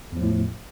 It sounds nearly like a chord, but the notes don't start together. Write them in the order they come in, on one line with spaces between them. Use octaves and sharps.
E2 F3 A2